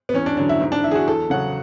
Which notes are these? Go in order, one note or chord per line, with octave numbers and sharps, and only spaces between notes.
B3
E2 C#4
D4
D3 F#3 D4
E4
G#2
D4
E3 E4
G#4
F#4
E2 A4
C#3 F#3 F#5